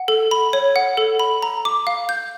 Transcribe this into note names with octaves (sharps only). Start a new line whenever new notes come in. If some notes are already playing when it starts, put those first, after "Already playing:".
Already playing: F#5
A4
B5
C#5
F#5
A4
B5
A#5
D6
F5
G6